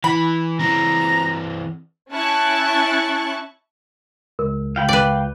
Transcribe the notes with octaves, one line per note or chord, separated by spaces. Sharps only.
E3 B5
E3 C4 A#5
C#4 E4 A5 C#6 F#6 A6
C#2 A#4
C#2 F5 G5 B5
B4 D5